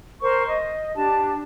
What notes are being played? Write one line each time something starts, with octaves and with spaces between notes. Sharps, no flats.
A#4 C5 C#6
D#5
D4 G4 A5